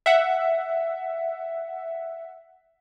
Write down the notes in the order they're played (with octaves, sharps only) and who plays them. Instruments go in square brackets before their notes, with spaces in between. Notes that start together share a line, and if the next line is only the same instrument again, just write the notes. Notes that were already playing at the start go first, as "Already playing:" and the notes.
[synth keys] E5 F#5